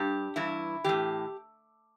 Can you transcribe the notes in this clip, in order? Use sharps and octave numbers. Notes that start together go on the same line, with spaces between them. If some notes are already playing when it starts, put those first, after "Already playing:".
Already playing: G2 G4
G2 E3 E4
A2 E3 G4